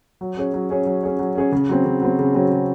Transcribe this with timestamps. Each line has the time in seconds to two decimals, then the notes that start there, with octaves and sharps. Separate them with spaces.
0.21 F#3
0.37 C#4 G#4 C#5
0.54 F#3
0.70 C#4 G#4 C#5
0.86 F#3
1.03 C#4 G#4 C#5
1.19 F#3
1.35 C#4 G#4 C#5
1.52 C#3
1.69 F#3 C4
1.85 C#3
2.01 F#3 C4
2.19 C#3
2.34 F#3 C4
2.51 C#3